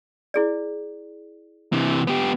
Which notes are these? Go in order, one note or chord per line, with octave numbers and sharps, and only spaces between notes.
E4 G#4 D5
C3 E3
B3 G4